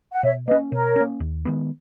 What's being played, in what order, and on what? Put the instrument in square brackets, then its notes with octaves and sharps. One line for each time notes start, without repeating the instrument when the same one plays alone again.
[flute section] F#5
[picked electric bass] B2 [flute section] C#5 E5
[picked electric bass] A#3 [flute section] B4 D#5
[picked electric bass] C#4
[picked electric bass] B2 [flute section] A#4 C#5
[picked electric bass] A#3 C#4
D#2
D#3 G#3 B3